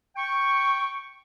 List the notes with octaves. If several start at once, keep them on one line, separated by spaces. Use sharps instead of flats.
G5 C#6